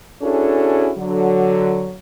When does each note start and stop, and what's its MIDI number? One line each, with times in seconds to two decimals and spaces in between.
0.22 0.92 61
0.22 0.92 62
0.22 0.92 64
0.22 0.92 66
0.22 0.92 68
0.22 0.92 69
0.98 1.94 50
0.98 1.94 54